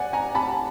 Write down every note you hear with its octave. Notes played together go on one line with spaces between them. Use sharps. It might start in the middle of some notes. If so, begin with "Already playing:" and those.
Already playing: D5 F#5 G#5
G#5 A#5
A5 B5